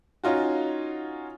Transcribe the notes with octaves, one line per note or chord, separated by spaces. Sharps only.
C#4 D#4 F4 F#4